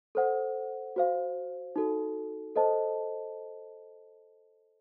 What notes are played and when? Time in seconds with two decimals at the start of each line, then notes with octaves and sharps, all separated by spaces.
0.15 A4 C5 F#5
0.96 F#4 C5 F5
1.76 D#4 F#4 A4
2.56 A4 C5 D#5 A5